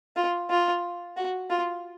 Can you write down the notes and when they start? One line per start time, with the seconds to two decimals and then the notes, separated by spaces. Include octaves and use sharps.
0.16 F4
0.50 F4
1.17 F#4
1.50 F4